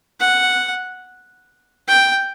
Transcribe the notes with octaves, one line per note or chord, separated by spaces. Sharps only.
F#5
G5